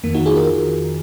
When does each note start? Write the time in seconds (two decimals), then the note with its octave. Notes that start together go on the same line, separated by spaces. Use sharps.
0.03 F2 D#3 A#3
0.14 D#4 F#4
0.25 F4 G#4
0.36 F#4 A#4
0.47 F2 D#3